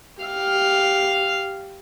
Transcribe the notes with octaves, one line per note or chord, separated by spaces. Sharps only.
G4 F5